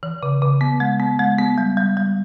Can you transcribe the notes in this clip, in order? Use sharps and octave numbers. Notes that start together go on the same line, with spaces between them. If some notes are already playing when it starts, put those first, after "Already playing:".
E3
C#3
C#3
B3
G#3
B3
G#3
B3
G3
G3
G3